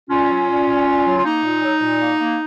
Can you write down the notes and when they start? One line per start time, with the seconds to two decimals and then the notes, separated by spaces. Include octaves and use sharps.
0.10 A#2 C#4 F4
0.30 F#3
0.49 A#2
0.68 A#2
0.87 A#2
1.05 F#3
1.17 F4
1.25 A#3 D#4
1.44 A#2
1.63 F#3
1.82 A#2
2.00 A#3
2.20 A#3